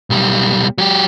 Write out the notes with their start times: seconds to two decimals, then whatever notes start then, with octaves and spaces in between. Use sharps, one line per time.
0.10 B1 G3
0.78 F#3 G4